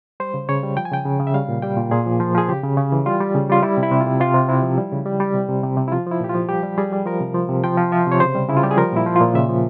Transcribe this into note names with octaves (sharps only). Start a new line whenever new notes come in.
G3 C5
C#3
C#3 C#5
G3
F3 G5
G#5
C#3 G5
C#3
C#3
E5
G3 F5
A#2
G3 G5
A#2
A#2 G#4
F3
F3
F3 G#4
C#3 G4
C#3
C#3
E3
G3 F4
G3
C#3
G3 F4
G3 E4
C3
E4
C3
F4
C3
C3 F4
C3
C3 E4
F3
G3
C#3
G3
G3
C3
C3
C3
C3
E4
F3 F4
F3 E4
A#2 G4
F4
F3
G3 G4
G3
G3 G#4
G3
F3 A#4
C3
F3
C3
F3 G5
F3
F3 E5
C3 C#5
C#3 C5
G3
C#3 E4
F4
G3 G4
G#4
F3 A#4
A#2 E4
F3
A#2 F4
C#3 E5
F3